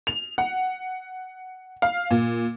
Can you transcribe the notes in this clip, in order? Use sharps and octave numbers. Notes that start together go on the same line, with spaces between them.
F7
F#5
F5
A#2